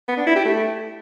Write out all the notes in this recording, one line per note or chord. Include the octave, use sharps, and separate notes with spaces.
B3
D4
E4
G4
A3